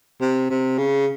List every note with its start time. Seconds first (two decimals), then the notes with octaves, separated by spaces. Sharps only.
0.21 C3
0.50 C3
0.78 C#3